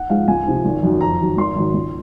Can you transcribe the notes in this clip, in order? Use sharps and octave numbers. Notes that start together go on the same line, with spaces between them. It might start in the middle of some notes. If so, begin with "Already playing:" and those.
Already playing: F#5
G#2 F3 G#3 F5
C#2 G#5
C3 F3
G#1
F#2 D#3 F#3
F2 A#5
D#3 F#3
G#1 C6
G#2 D#3 F#3
C#2